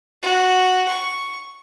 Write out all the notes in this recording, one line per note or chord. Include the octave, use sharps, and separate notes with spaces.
F#4
C#6